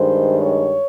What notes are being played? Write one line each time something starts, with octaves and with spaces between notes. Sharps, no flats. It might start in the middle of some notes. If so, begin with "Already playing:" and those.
Already playing: G2 D#3 G#3 C5
C#5